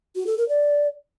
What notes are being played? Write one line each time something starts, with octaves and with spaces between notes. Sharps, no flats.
F#4
A4
A#4
D5